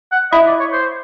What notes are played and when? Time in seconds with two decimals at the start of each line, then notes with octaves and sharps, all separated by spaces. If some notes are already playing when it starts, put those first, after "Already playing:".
0.12 F#5
0.32 E4 D#5
0.47 D5
0.60 C#5
0.73 C5